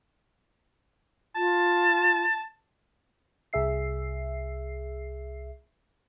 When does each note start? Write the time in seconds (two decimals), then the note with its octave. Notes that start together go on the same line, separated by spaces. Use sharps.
1.36 F4 A5
3.53 C2 G#4 E5 C7